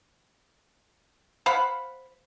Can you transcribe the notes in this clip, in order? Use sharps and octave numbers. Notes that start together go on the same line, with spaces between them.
C5 F5 F#5 B5